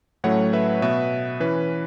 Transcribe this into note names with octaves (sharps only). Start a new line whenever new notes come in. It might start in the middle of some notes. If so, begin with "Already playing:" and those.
A2 F#3 A3 C#4 C#5 F#5
B4 E5
B2 B3 B4 E5
E3 C#4 B4